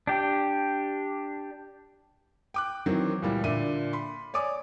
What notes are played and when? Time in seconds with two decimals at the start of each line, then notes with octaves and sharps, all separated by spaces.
0.07 D4 G4
2.54 G5 D6 F#6
2.86 D#3 E3 F#3 C4
3.22 C#2 A#2 E3 G3
3.44 A#2 D3 D4 E5 D#7
3.93 B5 C6
4.34 C#5 D5 G#5 D6 D#6